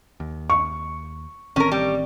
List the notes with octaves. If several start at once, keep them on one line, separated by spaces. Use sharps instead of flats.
D#2
C#6
A1 D#3 C4 C#4 A#4
G3